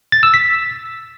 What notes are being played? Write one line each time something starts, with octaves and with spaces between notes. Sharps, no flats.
A6
E6
B6